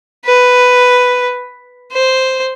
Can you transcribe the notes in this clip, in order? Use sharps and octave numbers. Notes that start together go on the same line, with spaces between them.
B4
C5